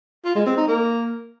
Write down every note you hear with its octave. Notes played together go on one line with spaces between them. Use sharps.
F4
G#3
C4
D#4
A#3